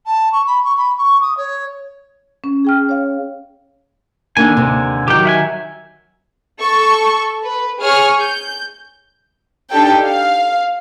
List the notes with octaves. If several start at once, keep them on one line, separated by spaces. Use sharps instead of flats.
A5
C#6
B5
C#6
B5
C#6
D#6
C#5
C#4
G#4 G5 F6
C#5 F5
D3 D#3 A#3 D4 G#5
D#2 C3
D#3 F#3 G4 G5
E5 F#5 G#5
A4 C#6
B4
G#4 C#5 G#5 C#6 F6
G6
D4 D#4 G4 A4 G5
F5